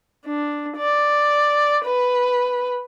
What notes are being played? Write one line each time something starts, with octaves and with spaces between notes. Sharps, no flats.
D4
D5
B4